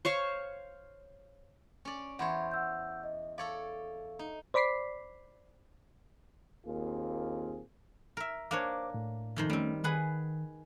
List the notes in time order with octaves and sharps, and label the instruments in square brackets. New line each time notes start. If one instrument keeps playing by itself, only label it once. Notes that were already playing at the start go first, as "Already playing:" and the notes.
[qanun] C5 C#5 F5 C#6
[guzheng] C#4 D5
[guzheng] E2 C5 C#5 [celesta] F#5 B5
[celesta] F#5 E6 G6
D#5
[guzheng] A4 C#5 D5 [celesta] F5
[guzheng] D#4
[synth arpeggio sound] C5 D5 B5 D6 B6 C7
[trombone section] D#2 A#3 C4 F4 G#4
[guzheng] A#4 E5
[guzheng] A#3 D4 C#5 [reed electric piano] C5 D6
[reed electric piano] A2
[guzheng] F2 D#3 C5
[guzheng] G3 C4 [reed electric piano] A3 C#4
[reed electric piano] D#3 [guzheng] G#4 B4 F#5